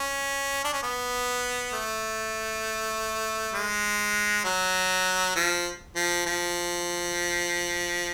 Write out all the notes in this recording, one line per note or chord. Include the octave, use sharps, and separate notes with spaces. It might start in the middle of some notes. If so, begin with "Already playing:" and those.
Already playing: C#4
D4
C#4
B3
A3
G#3
F#3
F3
F3
F3